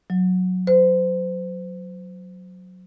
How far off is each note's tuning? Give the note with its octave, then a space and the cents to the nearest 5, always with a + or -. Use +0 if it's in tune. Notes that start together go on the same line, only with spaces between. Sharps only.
F#3 -10
C5 -30